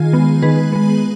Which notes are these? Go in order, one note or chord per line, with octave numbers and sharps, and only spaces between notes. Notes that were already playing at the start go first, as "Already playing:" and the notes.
Already playing: D#3 F4 G#4
G#3 B3
D#3 G#4 B4
G#3 B3